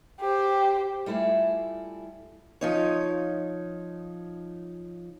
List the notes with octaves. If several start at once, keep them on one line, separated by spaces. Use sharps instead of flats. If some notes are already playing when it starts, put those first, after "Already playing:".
G4 C5
G3 A3 E4 F4 G#4
F3 D#4 C#5